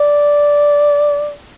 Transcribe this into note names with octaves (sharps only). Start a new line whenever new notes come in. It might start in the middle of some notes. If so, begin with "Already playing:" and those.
Already playing: D5